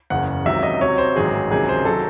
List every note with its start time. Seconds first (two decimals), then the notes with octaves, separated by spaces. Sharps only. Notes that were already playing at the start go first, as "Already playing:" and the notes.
0.10 F#1 E2 C#3 F#5
0.46 C#2 C3 D#3 F#3 E5
0.63 D#5
0.81 C2 C3 F#3 C#5
0.98 C5
1.15 A1 G#2 D#3 F#3 G#4
1.51 C#2 C3 D#3 F#3 G#4
1.69 C5
1.85 D#3 F#3 A4